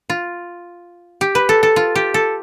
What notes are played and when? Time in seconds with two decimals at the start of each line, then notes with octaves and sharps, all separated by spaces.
0.10 F4
1.21 G4
1.35 B4
1.49 A4
1.63 A4
1.76 F4
1.95 G4
2.14 A4